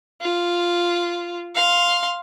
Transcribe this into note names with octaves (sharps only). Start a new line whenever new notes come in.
F4
F5 C6